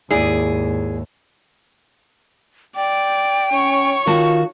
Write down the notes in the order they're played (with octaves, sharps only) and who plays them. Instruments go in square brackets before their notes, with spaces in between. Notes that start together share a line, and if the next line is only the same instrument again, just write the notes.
[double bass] D#2 G#2 [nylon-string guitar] E4 D5 [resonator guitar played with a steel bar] G#4
[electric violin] D5 [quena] G5
[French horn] C#4 [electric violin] C#5 C#6
[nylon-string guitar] D#3 F#4 A5 [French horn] F4